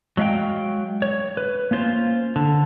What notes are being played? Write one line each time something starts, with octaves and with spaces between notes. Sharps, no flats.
F#3 G#3 E5 F5 G5
C#5
B4
A#3 C#4 F4 C5
D3